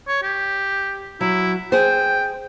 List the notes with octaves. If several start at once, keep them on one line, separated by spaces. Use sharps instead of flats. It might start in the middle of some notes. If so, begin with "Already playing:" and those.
C#5
G4
F#3 E4
G#4 C5 G5